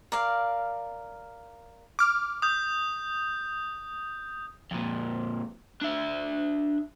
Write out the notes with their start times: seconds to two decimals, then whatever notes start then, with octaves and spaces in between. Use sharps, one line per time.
0.12 A#4 D5 F5
1.99 D6 F6
2.42 D#6 G6
4.71 F2 A#2
5.81 D4 E5